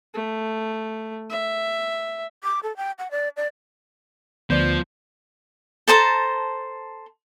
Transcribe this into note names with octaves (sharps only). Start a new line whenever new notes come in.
A3
E5
D6
A4
G5
F#5
D5
D5
D2 F3 B3 C5 D5
A4 C5 A5 A#5